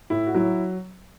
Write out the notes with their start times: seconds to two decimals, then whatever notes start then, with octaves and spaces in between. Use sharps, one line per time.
0.10 A2 E4
0.27 F#4
0.34 F#3 E4